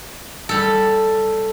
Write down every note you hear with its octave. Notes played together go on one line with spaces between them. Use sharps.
G3 A4